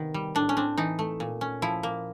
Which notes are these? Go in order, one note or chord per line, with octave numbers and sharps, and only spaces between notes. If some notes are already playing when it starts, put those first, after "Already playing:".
Already playing: C3 D#3 B3
G3
A2 D4
C#4
C4 D4
E3 D#4
A3
A#2
C#4
F3 E4
A#3